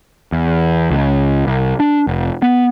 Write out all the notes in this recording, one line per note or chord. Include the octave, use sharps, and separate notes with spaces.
E2
C#2
C2
D4
F1
B3